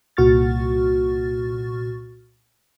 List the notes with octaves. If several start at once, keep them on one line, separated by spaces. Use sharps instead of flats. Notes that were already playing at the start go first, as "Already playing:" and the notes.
C2 A#2 F#4 C#6 F6 A6